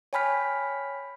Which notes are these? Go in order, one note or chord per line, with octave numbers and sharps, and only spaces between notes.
C#5 G5 G#5 B5 F6 B6